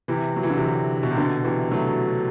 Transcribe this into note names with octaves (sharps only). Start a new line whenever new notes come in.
C3 E3
F#3
E3
D3
C3 E3
B2
C3
B2 D3
C3 E3
F#3 A3